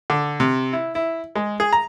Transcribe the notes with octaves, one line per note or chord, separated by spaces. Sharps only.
D3
C3
E4
E4
G#3
G#4
A#5